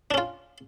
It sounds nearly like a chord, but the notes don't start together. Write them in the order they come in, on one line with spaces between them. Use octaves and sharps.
D4 C#4 F4